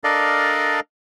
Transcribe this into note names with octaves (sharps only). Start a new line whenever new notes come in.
D4 A4 A#4 D5 D#5 F5